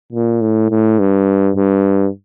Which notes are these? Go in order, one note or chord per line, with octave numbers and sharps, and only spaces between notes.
A#2
A2
A2
G2
G2